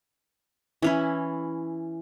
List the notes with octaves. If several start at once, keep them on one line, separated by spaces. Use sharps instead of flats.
E3 C#4 E4